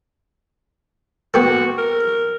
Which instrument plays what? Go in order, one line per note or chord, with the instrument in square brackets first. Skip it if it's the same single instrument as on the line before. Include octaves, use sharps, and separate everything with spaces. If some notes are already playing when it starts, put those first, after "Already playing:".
[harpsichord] B3 G4 A4 [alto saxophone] F#4
[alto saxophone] A#4